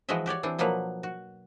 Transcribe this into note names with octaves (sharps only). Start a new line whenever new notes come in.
E3 F3 G#3 F#4 D#5 E5
F#4 G4 C#5 D5
E3 C4 D4
B2 F3 F#3 A#3 B4
F#4